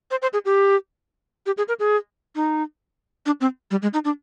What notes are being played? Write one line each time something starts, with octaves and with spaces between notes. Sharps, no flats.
C5
C5
G#4
G4
G4
G#4
A#4
G#4
D#4
D4
C4
G3
G#3
D#4
D4